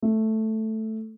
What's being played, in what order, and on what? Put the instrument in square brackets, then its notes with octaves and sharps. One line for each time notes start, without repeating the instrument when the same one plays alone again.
[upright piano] A3